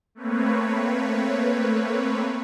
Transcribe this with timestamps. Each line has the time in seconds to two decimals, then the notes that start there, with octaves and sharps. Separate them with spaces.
0.15 A3 A#3 C4 B4 C#5